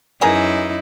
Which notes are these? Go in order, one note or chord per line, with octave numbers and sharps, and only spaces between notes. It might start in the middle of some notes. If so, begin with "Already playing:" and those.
F#2 E3 D#4 E4 G#4 A#4